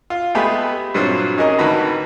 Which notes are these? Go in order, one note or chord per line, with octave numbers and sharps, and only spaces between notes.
F4
G#3 A3 B3 G4 G#4 B4
G2 A#2 F#3 C4 C5
C#4 D#4 G#4 A#4 D#5
G#1 D2 D#3 F#4 B4 A#5